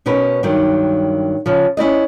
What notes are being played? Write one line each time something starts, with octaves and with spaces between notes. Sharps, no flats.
B2 C#4 A#4 B4
G2 D#3 F#3
C#3 F3
C#4 E4 D5 D#5